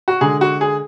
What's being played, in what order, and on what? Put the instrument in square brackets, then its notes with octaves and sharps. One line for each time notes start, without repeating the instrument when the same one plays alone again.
[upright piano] F#4
D3 G#3 G#4
F#4
G#4